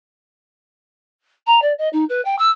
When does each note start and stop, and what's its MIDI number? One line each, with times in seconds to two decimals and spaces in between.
1.46 1.61 82
1.62 1.73 74
1.78 1.89 75
1.92 2.04 63
2.09 2.23 71
2.24 2.37 79
2.38 2.50 88